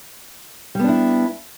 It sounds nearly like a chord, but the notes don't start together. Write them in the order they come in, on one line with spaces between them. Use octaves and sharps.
G3 B3 D4 E4